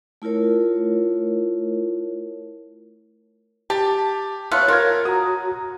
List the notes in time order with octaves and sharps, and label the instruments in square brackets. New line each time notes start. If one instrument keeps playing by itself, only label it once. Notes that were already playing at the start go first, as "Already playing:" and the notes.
[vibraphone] A3 E4 F4 A#4 C#5
[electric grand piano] G4 [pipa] A5
[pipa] A3 B3 F4 [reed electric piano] C#5 F#6
[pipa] F4 [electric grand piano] A#4 G#6
[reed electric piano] F#4 A#5 [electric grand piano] D#6